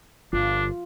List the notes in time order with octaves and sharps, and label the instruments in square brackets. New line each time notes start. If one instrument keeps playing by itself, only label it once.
[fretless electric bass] G1 [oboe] D4 [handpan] F4